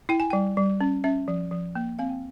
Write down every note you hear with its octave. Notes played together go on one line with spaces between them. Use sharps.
E4 G5
G#5
G3 G5
G3
C#4
C#4 E5
F3
F3
A#3
C4 F5
G5